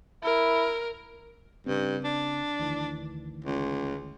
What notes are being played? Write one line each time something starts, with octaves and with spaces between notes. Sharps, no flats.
E4 A#4
G2 C#3 C4
D4
D2 D#3 E3
C#2